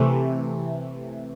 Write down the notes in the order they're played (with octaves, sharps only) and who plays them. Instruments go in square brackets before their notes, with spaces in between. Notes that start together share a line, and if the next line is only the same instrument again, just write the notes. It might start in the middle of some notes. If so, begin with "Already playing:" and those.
Already playing: [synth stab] C3 E3 A3